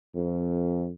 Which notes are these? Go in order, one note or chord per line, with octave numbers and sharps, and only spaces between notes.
F2